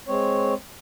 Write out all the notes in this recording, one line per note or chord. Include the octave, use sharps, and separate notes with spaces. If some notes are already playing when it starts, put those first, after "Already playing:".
G#3 C4 C#5